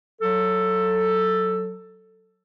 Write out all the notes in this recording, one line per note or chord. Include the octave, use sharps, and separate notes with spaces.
F#3 A4